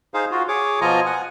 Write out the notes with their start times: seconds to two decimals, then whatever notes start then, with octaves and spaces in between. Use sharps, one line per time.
0.14 D#4 G#4 C5 F5
0.31 F4 F#4
0.48 G#4 C#5 D6
0.81 B2 F3 F4 D#5 G#5 A#5
1.06 F#5 G#5